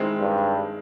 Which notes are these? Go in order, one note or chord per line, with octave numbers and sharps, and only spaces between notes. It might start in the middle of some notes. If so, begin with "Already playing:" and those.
Already playing: D#3 G#3 C4 E4
G2